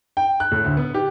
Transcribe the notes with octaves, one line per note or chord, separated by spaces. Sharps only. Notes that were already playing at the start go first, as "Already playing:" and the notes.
G5
F#6
A2
D2
B3
G4